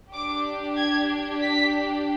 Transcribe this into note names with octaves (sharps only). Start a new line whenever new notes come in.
D4 G4 D6
G#6
B6